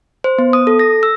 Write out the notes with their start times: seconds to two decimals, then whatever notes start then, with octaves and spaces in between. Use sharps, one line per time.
0.24 C5
0.38 B3
0.53 D#6
0.67 A4
0.79 A#6
1.03 E6